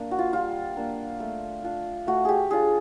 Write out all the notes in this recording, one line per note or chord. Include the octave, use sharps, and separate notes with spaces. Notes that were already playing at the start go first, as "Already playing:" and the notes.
Already playing: A#3 D4
F#4
F4
G3 F4
A#3 D4
A3
D4 F4
A3 F#4
G4 G#4
D4 F4 G#4